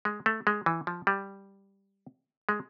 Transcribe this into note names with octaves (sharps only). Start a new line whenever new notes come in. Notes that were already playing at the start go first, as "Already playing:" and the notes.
G#3
A3
G#3
E3
F3
G3
G#3